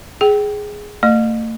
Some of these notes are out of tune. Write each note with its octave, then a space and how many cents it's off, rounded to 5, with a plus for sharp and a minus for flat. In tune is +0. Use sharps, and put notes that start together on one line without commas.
G#4 +0 G5 -20
A3 +40 D#5 -35